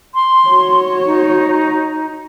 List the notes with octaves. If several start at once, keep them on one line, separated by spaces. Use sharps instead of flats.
C6
F#4 C#5
D#4